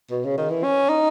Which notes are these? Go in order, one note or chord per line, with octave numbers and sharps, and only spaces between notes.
B2
C#3
D#3
E3
C#4
D#4